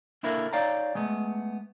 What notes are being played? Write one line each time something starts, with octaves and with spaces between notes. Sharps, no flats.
A#3 D4 E4 A4 A#4
D#4 C#5 D5 F5 G5 A#5
G#3 A3 B3